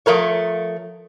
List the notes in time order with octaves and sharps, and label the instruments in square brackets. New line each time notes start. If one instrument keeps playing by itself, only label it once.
[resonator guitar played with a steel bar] F3 A3 A#4 C#5